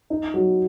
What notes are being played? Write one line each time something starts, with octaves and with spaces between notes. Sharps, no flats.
D#4
F#3